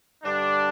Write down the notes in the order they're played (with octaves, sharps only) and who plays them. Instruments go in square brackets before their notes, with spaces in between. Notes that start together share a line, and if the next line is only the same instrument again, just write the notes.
[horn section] G2 D3 G3 D4